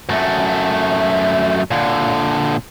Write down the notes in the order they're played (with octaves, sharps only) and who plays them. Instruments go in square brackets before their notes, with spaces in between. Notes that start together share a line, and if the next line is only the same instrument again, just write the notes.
[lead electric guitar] F#2 A3
A#2 D3